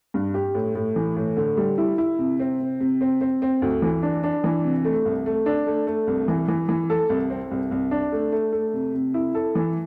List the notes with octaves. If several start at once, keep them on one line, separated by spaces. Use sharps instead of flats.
G2
G4
A2
A2
E3
A2
D3
G3
E4
E4
C3
C4
C3
C3
C4
C4
C4
D2
E3
D4
D4
E3
C3
A3
C2
A3
D4
A3
A3
C2
E3
E3
E3
A4
C2
C4
C2
C2
D4
A3
A3
A3
C3
C3
E4
A4
E3